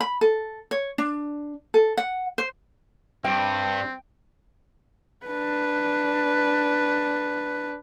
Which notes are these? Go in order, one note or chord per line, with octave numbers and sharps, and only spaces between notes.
B5
A4
C#5
D4
A4
F#5
C5
G2 C4 G5
D4 B4